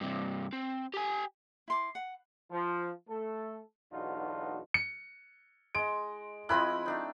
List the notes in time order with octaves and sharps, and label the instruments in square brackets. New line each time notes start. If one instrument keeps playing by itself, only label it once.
[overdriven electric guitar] G2 C3
C4
G4 G#5
[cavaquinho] E4 C6 D6
F#5
[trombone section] F3
A3 A4
B1 E2 D4 D#4 F4 F#4
[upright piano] C#7
[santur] G#3 D#5 [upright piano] D7
[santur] F3 C4 E4 [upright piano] D#5 B5 F#6
[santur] A3 D4 D#4